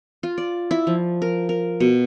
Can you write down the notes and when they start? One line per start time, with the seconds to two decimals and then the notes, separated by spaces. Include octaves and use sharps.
0.23 F4
0.38 D5
0.71 E4
0.87 F3
1.22 A#4
1.49 A#4
1.80 B2